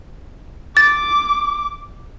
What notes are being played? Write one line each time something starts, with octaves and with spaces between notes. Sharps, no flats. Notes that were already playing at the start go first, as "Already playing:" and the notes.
D6 A6